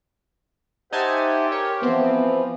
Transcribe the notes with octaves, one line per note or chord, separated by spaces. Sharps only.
D#4 G4 C5 E5 F#5 G#5 A5
A#4 C#5
E3 F3 B3 C4